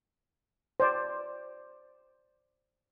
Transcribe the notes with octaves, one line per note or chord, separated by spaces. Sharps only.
C5 D5